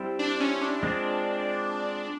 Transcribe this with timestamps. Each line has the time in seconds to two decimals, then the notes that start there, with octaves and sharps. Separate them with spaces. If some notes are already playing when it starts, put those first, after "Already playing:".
Already playing: G3 C4 E4
0.19 D4
0.40 C#4
0.61 D4
0.83 G#3 C4 F4